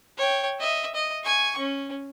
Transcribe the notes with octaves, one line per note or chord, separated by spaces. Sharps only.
C#5 G5
D#5 E5
D#5
G#5 C#6
C#4